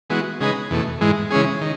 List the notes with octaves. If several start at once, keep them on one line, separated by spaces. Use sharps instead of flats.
E3 G#3 B3 F#4
C#3 G#3 D#4 G#4 B4
E2 B2 A3
G#2 E3 G#3
C#3 E3 G#3 C#4 G#4
D#3